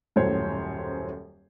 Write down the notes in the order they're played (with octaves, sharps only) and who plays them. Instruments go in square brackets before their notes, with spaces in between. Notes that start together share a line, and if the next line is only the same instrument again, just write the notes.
[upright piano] D#1 F#2 A2 C5 C#5